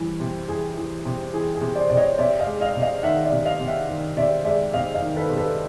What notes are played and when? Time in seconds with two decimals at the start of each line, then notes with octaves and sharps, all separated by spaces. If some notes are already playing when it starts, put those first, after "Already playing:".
Already playing: C3 E3 G3
0.20 C3
0.48 E3 G#4
0.77 E3
1.05 C3
1.33 E3 G#4
1.55 G#4
1.61 C3
1.75 C5 D5
1.90 C3 D5
1.97 C#5 D#5
2.18 C3 D5 E5
2.39 D#5 F5
2.47 G#3
2.61 D#5 F5
2.75 C3
2.82 D#5 F5
3.03 D#3 E5 F#5
3.25 D5 E5
3.32 C3
3.45 D#5 F5
3.60 C3
3.67 E5 F#5
3.89 D#3
4.17 C3 D5 E5
4.45 G#3 D5 E5
4.73 C3 D#5 F5
4.94 D#5 F5
5.02 D#3
5.16 A4 B4
5.29 C3
5.37 A4 B4